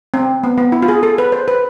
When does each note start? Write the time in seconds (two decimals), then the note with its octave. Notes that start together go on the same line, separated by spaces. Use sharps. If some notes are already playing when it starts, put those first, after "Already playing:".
0.14 C4
0.44 B3
0.58 B3
0.72 E4
0.82 F4
0.88 G#4
1.03 A4
1.18 B4
1.32 C5
1.48 B4